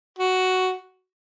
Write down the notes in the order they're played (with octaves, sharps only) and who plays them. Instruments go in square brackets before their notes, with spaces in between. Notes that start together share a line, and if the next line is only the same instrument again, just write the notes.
[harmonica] F#4